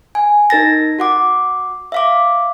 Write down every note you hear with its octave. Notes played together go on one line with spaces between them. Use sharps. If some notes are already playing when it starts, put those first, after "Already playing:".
G#5
D#4 A#4 A6 A#6
F#4 F#5 D6
E5 F5 D6